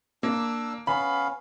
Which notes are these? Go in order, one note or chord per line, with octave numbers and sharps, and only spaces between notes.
A#3 D4 E6
B3 C#4 F5 B5